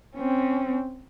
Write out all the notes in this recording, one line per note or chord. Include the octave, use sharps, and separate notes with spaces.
C4 C#4